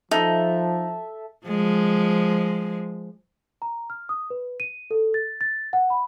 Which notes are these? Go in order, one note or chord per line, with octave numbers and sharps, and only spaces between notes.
F3 D#4 A4 E5
F3 G#3
A#5
F6
D#6
B4
D#7
A4
A6
A6
F#5
B5